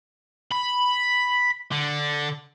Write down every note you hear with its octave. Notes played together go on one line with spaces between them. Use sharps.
B5
D3